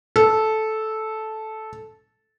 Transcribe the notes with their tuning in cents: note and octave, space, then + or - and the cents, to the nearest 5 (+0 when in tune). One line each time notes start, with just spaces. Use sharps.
A4 -10